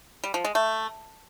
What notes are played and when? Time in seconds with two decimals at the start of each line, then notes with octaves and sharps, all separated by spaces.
0.24 G3
0.34 F3
0.45 G#3
0.55 A3